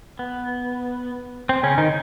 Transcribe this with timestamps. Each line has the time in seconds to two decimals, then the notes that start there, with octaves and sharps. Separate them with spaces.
0.19 B3
1.49 C4
1.63 C#3 C#4
1.78 D#3 D#4